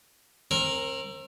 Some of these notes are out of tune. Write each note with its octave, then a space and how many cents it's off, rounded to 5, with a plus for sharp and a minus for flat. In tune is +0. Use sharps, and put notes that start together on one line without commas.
C4 +35 A#4 +0